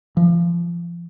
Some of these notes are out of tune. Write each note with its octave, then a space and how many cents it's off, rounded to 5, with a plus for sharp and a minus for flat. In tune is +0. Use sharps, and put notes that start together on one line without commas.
F3 -30